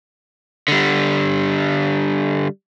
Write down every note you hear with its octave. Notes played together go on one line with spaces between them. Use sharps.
D3 G3